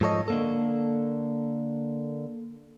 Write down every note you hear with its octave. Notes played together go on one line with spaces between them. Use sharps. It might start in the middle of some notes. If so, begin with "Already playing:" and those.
G#2 F3 A4 C#5 D#5
D3 A#3 A4